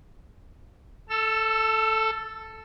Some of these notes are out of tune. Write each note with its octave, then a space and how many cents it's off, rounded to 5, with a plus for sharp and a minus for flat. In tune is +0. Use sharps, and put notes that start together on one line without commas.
A4 +0 E6 +30